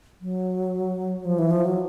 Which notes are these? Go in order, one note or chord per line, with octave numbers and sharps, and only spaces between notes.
F#3
F3
E3
F3
F#3